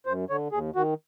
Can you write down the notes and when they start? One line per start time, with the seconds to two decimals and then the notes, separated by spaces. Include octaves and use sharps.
0.06 F#2 C5
0.30 D3 C#5
0.52 D#2 G#4
0.76 D#3 F#4